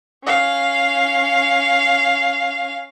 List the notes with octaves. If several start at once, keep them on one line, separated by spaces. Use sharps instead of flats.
C#4 F5